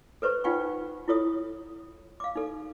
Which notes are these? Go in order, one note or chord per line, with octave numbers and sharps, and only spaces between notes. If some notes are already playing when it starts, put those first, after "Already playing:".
A4 B4 C5 C#6
D#4 F4 F#5 G5 C#6
E4 F4 A4 C#5 D#6
F5 D6
D#4 A4